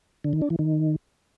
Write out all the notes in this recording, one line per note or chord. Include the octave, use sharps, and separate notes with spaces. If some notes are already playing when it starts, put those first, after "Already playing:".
D3
D#3
D4
E3
D#3